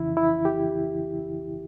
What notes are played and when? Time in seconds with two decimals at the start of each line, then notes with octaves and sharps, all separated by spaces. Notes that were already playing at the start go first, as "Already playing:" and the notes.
Already playing: F2 C#3 E3 E4
0.17 E4
0.45 G4